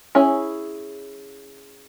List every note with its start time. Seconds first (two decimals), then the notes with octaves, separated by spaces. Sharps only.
0.15 C#4 E4 G#4 C#5